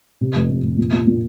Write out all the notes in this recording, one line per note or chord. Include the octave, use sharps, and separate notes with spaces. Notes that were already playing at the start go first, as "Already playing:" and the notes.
C3
F1
F1
F1
A#2
A#2
A#2